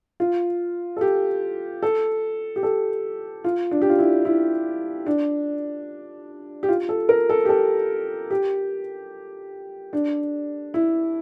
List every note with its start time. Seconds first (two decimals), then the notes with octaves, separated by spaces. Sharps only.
0.20 F4
0.97 A4
1.01 G4
1.83 A4
2.56 G4
2.63 A4
3.44 F4
3.71 D4
3.82 G4
3.90 F4
3.99 E4
4.25 E4
5.06 D4
6.63 G4
6.69 F4
6.89 A4
7.09 A#4
7.29 A4
7.45 G4
7.49 A4
8.31 G4
9.93 D4
10.74 E4